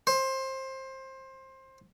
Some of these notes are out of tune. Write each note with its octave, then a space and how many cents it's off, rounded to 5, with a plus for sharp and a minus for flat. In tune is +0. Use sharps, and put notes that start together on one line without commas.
C5 +20